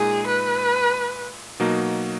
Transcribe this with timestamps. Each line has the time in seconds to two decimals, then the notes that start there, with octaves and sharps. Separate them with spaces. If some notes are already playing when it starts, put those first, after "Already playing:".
Already playing: A#2 G#3 D#4 G#4
0.27 B4
1.60 B2 F#3 A#3 D#4 F#4